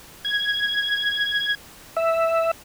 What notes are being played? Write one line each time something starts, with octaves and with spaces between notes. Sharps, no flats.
G#6
E5